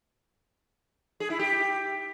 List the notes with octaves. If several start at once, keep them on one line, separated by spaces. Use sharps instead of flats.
G#4
E4
G4